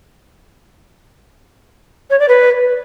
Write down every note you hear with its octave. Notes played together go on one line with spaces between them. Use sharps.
C#5
D5
B4